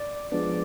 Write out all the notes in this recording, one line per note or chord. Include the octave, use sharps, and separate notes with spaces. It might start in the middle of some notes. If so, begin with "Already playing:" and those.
Already playing: D5
F3 G#3 B3 D4